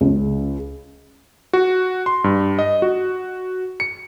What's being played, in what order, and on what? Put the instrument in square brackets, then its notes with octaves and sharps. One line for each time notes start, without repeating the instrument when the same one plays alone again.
[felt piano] C#2
[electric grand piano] F#4
C6
G2
D#5
F#4
C#7